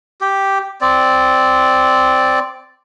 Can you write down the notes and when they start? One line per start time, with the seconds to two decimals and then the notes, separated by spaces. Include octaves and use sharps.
0.21 G4
0.81 C4 D5